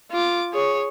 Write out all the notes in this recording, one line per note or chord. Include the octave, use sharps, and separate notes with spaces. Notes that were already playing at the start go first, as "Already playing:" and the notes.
F4 D6
G#4 C#5